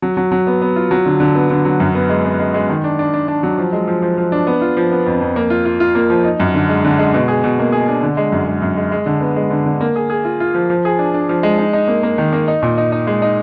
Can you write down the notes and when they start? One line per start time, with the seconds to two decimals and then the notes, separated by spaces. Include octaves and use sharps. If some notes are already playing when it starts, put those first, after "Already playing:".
0.02 F#3
0.17 F#3
0.32 F#3
0.47 B3
0.62 B3
0.76 F4
0.91 F#3
1.06 D3
1.20 D3
1.35 B3
1.50 D3
1.65 F#3
1.80 F#2
1.95 B3
2.09 G#3
2.25 B3
2.40 G#3
2.54 G#3
2.69 D#3
2.84 D4
2.99 D4
3.14 D4
3.28 D4
3.43 F#3
3.58 F3
3.73 G#3
3.87 F3
4.02 F3
4.18 F3
4.32 D4
4.47 B3
4.61 F4
4.77 F3
4.92 B3
5.06 F2
5.21 F2
5.36 A#3
5.50 F4
5.66 F4
5.80 F4
5.95 A#3
6.10 F3
6.24 D#4
6.40 F#2
6.54 D3
6.69 G#3
6.84 D3
6.99 G#3
7.14 B2
7.28 G#4
7.44 B2
7.59 A#3
7.72 G#4
7.88 D4
8.03 D3
8.17 G#3
8.32 F#2
8.47 G#3
8.62 F#2
8.77 G#3
8.91 G#3
9.06 D3
9.21 B3
9.36 G#3
9.50 D3
9.66 D3
9.81 A#3
9.96 G#4
10.10 G#4
10.25 F4
10.40 F4
10.54 F3
10.70 F3
10.85 G#4
10.99 D4
11.14 D4
11.29 F3
11.43 G#3
11.58 D#4
11.73 D#4
11.88 A#3
12.03 A#3
12.18 D#3
12.33 A#3
12.48 D#4
12.62 A#2
12.78 D#4
12.92 D#4
13.07 G#3
13.22 D#4